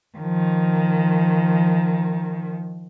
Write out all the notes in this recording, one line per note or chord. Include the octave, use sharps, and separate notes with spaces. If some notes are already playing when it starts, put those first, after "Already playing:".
D#3 F3